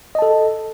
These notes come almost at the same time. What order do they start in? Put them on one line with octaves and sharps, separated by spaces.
D#5 A5 A4